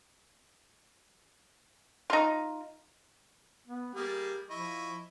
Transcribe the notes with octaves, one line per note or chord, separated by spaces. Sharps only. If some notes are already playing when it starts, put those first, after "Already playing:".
D#4 F4
B3
G3 A#3 G4 G#4
F3 E4 D#5 C#6